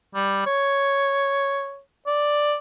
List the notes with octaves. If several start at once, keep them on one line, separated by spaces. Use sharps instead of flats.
G3
C#5
D5